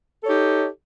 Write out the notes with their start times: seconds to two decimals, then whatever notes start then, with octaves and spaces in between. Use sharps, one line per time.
0.22 A4
0.25 C#5
0.27 G4
0.30 D#4